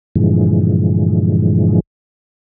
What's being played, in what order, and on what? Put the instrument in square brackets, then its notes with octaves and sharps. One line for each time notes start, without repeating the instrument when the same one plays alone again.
[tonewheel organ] G2 A#2 D3 E3 F3 G#3